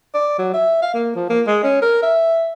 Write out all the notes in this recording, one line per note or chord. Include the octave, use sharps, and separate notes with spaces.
D5
F#3
E5
F5
A#3
F3
A#3
G#3
C#4
A#4
E5